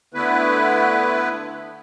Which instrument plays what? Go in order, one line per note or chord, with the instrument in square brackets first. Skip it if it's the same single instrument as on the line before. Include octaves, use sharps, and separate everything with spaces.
[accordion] D3 A3 B3 E4 B4